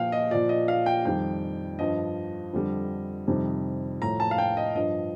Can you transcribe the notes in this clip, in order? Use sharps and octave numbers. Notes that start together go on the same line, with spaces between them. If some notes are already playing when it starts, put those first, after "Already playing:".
Already playing: A#2 F3 F5 G5
D#5
A#2 F3 D5
D#5
F5
G5
F2 D#3 G3 G5
G2 F3 D#5
F2 D3 G3
F2 C3 D#3 G3
A2 F3 A#5
A5
F5
G5
D#5
G2 F3 D#5